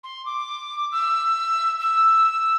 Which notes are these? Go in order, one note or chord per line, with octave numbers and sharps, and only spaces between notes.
C6
D6
E6
E6